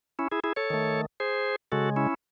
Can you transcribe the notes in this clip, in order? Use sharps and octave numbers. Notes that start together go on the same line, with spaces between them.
C#4 E4
E4 G#4
E4 G#4
A4 C#5
D#3 A3
G#4 C5
C#3 G#3 F#4 A4
C#4 E4